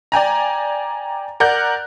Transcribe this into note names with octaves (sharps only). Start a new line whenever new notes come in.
D5 G5 G#5 A#5
A#4 D5 F#5 F#6 G6